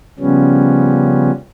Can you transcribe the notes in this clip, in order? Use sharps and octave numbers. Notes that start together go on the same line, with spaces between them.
C#3 F3 G3 B3 C#4